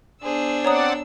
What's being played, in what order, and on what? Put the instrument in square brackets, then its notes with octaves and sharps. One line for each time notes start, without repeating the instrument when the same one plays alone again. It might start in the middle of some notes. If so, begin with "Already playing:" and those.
[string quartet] B3 D4 E6 [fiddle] G#4 C5
[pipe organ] C4 D5 F#5 [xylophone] C#5 A#5 D#6